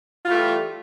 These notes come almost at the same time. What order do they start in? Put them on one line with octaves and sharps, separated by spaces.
F4 E3 A3 G3